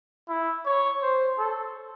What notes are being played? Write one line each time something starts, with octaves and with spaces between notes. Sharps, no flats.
E4
C#5
C5
A4